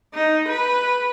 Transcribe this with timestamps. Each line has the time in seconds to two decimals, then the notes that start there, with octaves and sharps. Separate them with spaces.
0.14 D#4
0.49 B4